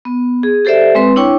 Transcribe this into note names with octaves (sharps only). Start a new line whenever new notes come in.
B3
G#4
G4 A4 C5 D5 E5
G#3 C4 B4 C6
D4 E4 C#5 G5 C#6